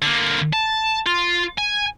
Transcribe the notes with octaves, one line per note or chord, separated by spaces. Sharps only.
D3 A#3
A5
F4
G#5